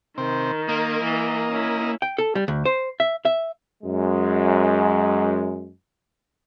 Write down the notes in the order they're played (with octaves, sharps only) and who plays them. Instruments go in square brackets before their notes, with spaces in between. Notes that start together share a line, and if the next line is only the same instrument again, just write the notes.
[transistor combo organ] C3 C4 [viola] D#3
[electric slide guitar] A#3 [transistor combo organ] A#4 D#5
[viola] E3
C#4 E4
[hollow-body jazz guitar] G5
A4
G3
D2
C5
E5
E5
[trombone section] F#2 G#3